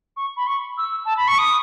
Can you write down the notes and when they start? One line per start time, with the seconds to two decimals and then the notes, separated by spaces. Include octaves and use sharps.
0.17 C#6
0.37 B5
0.47 C#6
0.78 E6
1.05 A5
1.17 B5
1.28 C#6
1.39 D#6